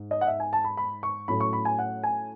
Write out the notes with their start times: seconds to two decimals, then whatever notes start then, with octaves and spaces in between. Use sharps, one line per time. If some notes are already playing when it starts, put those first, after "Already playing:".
Already playing: G#2
0.11 D#5
0.21 F#5
0.27 E5
0.40 G#5
0.53 A5
0.64 B5
0.77 B5
1.03 C#6
1.28 A2 F#3 A3 C#4 B5
1.40 C#6
1.53 B5
1.65 G#5
1.79 F#5
2.04 G#5